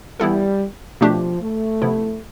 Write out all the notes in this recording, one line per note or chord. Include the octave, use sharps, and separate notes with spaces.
E3 G3 B3 E4 A4
B2 F3 A3 D4 G4
A3
C3 F3 B3 E4